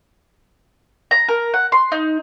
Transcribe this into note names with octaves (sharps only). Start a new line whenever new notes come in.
A#5
A#4
F#5
C6
D#4